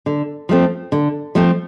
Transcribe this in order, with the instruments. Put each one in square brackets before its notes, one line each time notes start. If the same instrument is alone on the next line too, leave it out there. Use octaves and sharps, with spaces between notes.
[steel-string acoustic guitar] D3
F3 A3 C4
D3
F3 A3 C4